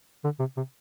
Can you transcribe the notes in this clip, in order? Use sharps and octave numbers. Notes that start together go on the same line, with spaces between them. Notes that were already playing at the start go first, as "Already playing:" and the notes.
D3
C3
C3